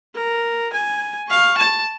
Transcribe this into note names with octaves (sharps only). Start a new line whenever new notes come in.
A#4
G#5
F5 C#6
A5